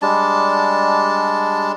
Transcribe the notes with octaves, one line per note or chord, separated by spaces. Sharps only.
G3 G#3 D4 A5